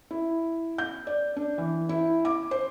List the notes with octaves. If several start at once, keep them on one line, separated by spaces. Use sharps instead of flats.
E4
G6
D5
D4
E3
E4
D6
C5